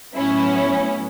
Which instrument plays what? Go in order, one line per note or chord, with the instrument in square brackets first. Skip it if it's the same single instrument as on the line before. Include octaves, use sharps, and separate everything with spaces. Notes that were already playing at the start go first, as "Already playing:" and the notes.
[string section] A2 F#3 B3 C#4 E4